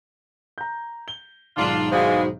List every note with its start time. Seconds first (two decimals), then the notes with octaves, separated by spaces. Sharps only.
0.58 A#5 G6
1.08 G7
1.57 B1 G#2 D#3 D4 F4
1.92 E3 G3 G#3 F#4 G#4 C5 F5